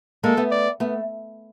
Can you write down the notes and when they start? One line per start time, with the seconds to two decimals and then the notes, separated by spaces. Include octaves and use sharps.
0.24 G#3 A#3 A4
0.37 A3 B3
0.51 D5
0.80 A3 B3